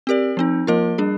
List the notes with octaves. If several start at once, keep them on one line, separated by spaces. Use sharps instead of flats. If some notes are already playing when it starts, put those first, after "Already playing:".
C4 G4 A#4 D5
F3 C4 D#4
F3 A#3 F4 A#4 D#5
G3 D4 G#4